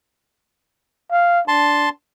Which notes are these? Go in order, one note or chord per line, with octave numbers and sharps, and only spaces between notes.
F5
D4 A5 C6